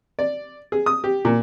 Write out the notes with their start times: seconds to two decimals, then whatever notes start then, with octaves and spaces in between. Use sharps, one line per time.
0.19 D5
0.72 G#4
0.86 D#6
1.04 G4
1.25 A#2